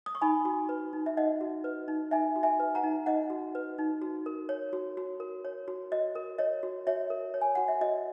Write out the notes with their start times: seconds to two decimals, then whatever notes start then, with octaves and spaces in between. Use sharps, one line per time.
0.06 D#6
0.15 C#6
0.21 D#4 G#5 B5
0.45 F#4
0.69 B4
0.93 D#4
1.06 E5
1.17 D#4 D#5 F#5
1.41 F#4
1.64 B4
1.88 D#4
2.11 D#4 E5 G#5
2.36 F#4
2.43 E5 G#5
2.60 B4
2.75 F#5 A#5
2.84 D#4
3.06 D#4 D#5 F#5
3.30 F#4
3.55 B4
3.78 D#4
4.02 F#4
4.26 A#4
4.49 C#5
4.73 F#4
4.97 F#4
5.20 A#4
5.45 C#5
5.68 F#4
5.92 F#4 D#5
6.15 A#4
6.38 C#5 D#5
6.63 F#4
6.87 F#4 C#5 E5
7.10 A#4
7.34 C#5
7.41 G#5
7.55 F#4 F#5
7.68 E5
7.81 F#4 D#5